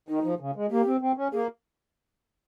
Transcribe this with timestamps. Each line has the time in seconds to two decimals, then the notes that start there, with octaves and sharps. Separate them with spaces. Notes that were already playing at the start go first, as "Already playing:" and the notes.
0.09 D#3 D#4
0.24 F3
0.40 C#3
0.56 G#3
0.71 A#3 G4
0.86 C4
1.01 C4
1.17 C#4
1.32 A#3 G#4